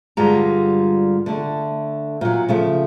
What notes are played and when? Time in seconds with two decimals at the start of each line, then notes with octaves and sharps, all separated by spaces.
0.17 G2 D3 G3 G#3 F4 A#5
1.26 D3 A3
2.21 A#2 F#3
2.49 C#3 F3 A3